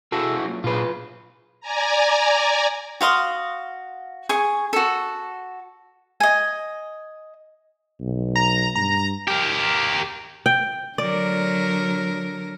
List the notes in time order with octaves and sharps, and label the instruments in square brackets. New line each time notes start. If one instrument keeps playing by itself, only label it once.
[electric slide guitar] E4 F#4 G#4 [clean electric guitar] A4
[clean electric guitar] F#2 A#2
[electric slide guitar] A#2 G#4 [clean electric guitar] F4 B4
[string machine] D5 G#5 A#5
[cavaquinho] F#4 F5 C6 D#6
G#4 C#6
F#4 A4
D#5 G#5
[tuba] B1
[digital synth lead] A#5
[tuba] G2 [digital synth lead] A#5
[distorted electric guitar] G4 A#4
[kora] G5
[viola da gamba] D3 F#3 A#4 [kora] D5